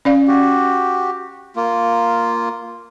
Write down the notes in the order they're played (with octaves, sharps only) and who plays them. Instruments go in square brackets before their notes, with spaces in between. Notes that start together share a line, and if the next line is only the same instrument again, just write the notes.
[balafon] C#4 D5 F5
[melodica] F#4 G4
A#3 F4